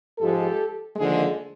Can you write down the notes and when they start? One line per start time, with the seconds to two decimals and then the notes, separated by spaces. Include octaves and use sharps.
0.18 G#2 F3 G#3 G4 A4
0.96 D#2 D3 F3 G#3